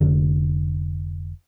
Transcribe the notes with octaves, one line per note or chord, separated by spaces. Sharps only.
F1 D3